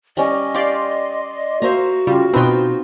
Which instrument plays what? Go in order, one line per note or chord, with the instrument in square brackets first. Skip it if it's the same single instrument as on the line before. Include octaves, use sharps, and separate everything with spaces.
[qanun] G3 C#4 [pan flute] D#5
[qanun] G4 F5 [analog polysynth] D5 C6
[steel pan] A#3 C5 [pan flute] F#4 [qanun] E5 A#5
[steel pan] C#3 F4 [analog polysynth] G3
[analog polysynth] B2 C4 [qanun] D#4 F4 G5 [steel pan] B4